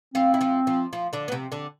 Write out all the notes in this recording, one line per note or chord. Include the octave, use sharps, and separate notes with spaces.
F3 C4 F4
E4
F3 F4
F3 F4
F3 F4
D3 D4
B3
C3 C4
D3 D4